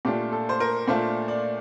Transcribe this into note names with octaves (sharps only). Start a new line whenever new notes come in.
A#2 A3 D4 F4 G4
A4
C5
A#4
A#2 A3 D4 F4 C5
D5